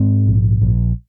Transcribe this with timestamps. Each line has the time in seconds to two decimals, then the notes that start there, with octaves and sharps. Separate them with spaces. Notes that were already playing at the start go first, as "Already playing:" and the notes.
Already playing: G#2 G#3 C4
0.27 A#1
0.62 A#1